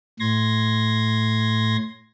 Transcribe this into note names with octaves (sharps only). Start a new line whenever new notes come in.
A2 C6 G#6 A#6